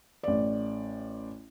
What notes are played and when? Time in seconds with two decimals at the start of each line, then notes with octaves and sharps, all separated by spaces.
0.23 A1 D5